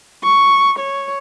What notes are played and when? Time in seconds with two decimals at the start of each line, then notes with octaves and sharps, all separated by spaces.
0.24 C#6
0.79 C#5